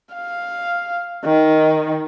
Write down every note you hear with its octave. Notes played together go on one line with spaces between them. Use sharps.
F5
D#3